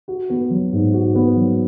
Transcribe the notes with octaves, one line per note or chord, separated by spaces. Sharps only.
F#4
B3
F#3
G#2
F#4
B3
F#3